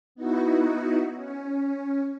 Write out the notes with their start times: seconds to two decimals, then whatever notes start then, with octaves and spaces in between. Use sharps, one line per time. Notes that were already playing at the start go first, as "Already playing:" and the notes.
0.15 B3 D#4 E4 F#4
1.14 C#4